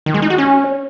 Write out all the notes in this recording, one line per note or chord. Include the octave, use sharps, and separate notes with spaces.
D#3
G#3
D#4
F#4
C#4